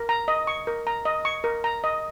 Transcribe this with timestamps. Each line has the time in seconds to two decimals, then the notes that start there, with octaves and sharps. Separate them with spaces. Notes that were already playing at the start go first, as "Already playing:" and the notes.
Already playing: A#4
0.09 A#5
0.28 D#5
0.47 C#6
0.67 A#4
0.87 A#5
1.05 D#5
1.25 C#6
1.44 A#4
1.64 A#5
1.84 D#5